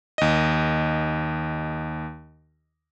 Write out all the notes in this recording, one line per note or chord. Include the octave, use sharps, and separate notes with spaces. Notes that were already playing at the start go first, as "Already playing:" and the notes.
D#2 D#5